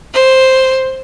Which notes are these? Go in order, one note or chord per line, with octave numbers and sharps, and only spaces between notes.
C5